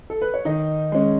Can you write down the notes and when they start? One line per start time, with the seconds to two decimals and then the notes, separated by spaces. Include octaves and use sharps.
0.10 A4
0.22 B4
0.34 C#5
0.45 D#3 D#4 D#5
0.92 G#3 C#4